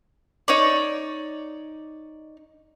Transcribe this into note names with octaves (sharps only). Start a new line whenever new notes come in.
D#4 C#5 D5